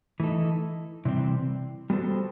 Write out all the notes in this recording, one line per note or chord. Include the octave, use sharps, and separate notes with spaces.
E3 A3 D#4 A4
C3 E3 G3 C4
G3 B3 F#4 A4 C5